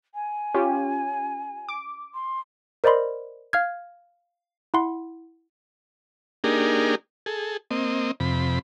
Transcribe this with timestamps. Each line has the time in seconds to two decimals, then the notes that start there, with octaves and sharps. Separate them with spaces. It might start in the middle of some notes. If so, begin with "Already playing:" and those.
0.14 G#5
0.54 C#4 F4 G4
1.69 D6
2.14 C6
2.84 A#4 C5 D5 D#5 B5 C6
3.53 F5 F6 G#6
4.74 E4 F#5 C6
6.44 A#3 D4 D#4 G4 G#4 A#4
7.26 G#4 A4
7.71 A#3 C4 D#5
8.20 F2 C3 B5